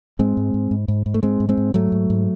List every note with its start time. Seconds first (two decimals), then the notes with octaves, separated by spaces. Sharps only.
0.19 G#2 G#3 C4
0.37 G#2
0.54 G#2
0.71 G#2
0.88 G#2
1.06 G#2
1.14 A3
1.23 G#2 G#3 C4
1.40 G#2
1.49 G#3 C4
1.57 G#2
1.74 G#2 F#3 A3
1.92 G#2
2.10 G#2